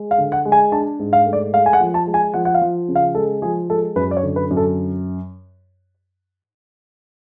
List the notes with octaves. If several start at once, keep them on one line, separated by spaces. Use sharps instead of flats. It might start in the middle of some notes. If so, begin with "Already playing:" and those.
Already playing: G#3
F5
D3
F#5
G#3
G#5
D4 A5
G#2
F5
A3
D5
G#3 F5
G#5
F#5
F3
A5
G#3
G#5
F3 F#5
F#5
F5
F3
C#3
F5
G#3 A4
F3 G#4
G#3 A4
F#2 B4
D5
C#5
D3
B4
F#2
A4